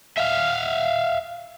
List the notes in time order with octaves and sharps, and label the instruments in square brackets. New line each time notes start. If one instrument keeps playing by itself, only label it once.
[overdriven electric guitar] E5 F5